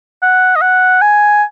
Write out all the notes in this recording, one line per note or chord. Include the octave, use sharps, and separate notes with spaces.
F#5
D#5
F#5
G#5